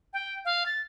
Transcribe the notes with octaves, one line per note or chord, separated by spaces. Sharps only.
G5
F5
A6